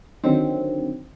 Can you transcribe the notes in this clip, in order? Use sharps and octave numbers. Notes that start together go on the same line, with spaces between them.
D3 D#3 F#3 C4